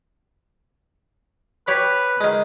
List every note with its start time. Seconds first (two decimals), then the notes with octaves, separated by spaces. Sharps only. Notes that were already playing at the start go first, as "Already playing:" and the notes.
1.67 G4 B4 C#5 B5
2.21 D#3 G#3